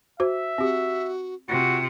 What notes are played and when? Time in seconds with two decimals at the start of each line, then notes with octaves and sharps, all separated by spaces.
0.20 F#4 C5 E5
0.58 C4 F#4 G4
1.49 C3 F4 F#4